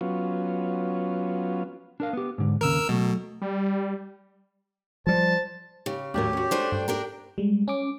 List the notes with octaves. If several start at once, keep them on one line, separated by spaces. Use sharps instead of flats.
F#3 B3 C#4 F4
D4 A#4 F5
B3 G4
G#2 D3
D#2 C#3 A#4 E6
B2 F#3 A3
G3
F3 G3 C5 A5
C#3 G4
D#2 A2 F#3 A3 D4 G4 A#4
C#4 F#4
A3 D4 C5 D5
G2 G5
D4 G4 A#4
G3 G#3
C#4 D6